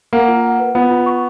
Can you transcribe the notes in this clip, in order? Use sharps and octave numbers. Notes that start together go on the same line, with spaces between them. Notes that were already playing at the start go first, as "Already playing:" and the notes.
A#3 F#5
F4
F#5
B4
B3 F4
F4
C#6